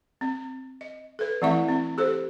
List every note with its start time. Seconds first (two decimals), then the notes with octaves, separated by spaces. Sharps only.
0.21 C4
0.81 D#5
1.19 A4 B4
1.42 E3 A3 C4 E4 E5 C#6
1.68 C4
1.98 G4 A4 C5